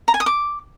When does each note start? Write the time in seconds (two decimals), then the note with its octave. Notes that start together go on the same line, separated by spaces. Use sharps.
0.08 A#5
0.14 G#5
0.20 D#6
0.26 D6